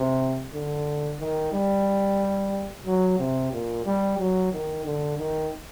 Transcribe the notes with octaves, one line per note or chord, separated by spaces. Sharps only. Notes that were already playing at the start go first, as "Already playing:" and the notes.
Already playing: C3
D3
D#3
G3
F#3
C3
A#2
G3
F#3
D#3
D3
D#3